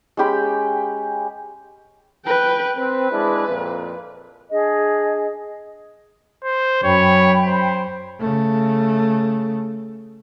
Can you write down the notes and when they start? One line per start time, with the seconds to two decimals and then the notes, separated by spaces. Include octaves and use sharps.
0.17 G#3 C#4 G4 B5
2.25 B4 G5
2.77 C4 B4
3.11 G#3 D4 E4
3.48 F2 A#2
4.50 D4 G#4 D#5
6.44 C5
6.84 F#2 C#5 G5 B5
7.47 C5
8.20 C#3 A3